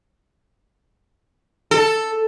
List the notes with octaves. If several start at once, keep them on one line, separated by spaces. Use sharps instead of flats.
A4